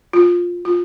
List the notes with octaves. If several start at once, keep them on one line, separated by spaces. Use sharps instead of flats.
F4
F4